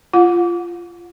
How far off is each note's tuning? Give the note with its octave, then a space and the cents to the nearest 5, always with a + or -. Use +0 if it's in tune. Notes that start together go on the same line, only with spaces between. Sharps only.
F4 -20 F#5 -35